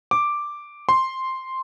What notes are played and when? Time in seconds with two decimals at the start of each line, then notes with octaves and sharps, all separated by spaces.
0.11 D6
0.89 C6